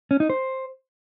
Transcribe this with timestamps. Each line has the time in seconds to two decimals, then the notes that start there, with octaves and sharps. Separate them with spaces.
0.11 C#4
0.20 D#4
0.30 C5